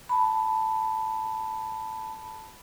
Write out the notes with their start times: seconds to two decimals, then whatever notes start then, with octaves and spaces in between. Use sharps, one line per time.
0.09 A5 B5